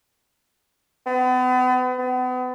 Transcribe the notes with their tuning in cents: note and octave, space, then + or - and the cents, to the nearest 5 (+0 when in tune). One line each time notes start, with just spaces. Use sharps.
B3 +40
B3 +35